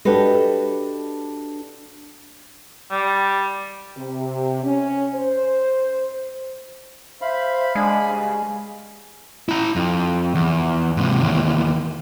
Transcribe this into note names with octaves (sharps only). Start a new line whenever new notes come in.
D4 F#4 G4 A4 B4 D#5
G3
C3
C#4
C5
C5 E5 F5 B5
G#3 D4 G#5
G2 C#3
E4 A#5
F2
E2
G#2 C3
D#2 E3